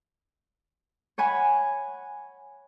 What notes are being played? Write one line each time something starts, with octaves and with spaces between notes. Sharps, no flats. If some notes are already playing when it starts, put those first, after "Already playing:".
C#5 F#5 G#5 B5